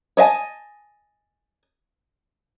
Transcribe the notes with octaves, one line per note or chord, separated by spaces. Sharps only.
C#5 D#5 E5 G#5 A5